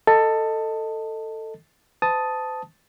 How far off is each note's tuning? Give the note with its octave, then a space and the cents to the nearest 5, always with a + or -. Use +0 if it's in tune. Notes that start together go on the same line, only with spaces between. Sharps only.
A4 +15 D#5 +0
C5 -45 A5 +0 D#6 +5